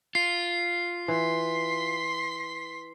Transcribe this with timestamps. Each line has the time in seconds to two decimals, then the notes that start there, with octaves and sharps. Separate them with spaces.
0.15 F4 C7
1.08 E3 C6 B6